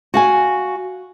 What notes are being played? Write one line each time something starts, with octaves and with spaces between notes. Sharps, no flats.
F#4 F5 G#5